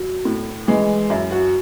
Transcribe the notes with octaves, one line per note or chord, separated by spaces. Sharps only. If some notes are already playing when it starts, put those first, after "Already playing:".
Already playing: F#3
A2
E3 G#3
F#2 E4
F#4